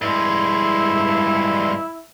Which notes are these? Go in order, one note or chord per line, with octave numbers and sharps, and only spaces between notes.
G2 G#3 E4